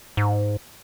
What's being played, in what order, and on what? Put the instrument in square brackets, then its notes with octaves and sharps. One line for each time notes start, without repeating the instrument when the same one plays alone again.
[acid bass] G#2